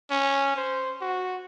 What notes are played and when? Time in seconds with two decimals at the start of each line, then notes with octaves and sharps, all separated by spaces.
0.11 C#4
0.56 C5
1.01 F#4